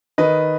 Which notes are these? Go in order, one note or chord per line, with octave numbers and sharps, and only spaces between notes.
D#3 B4 D#5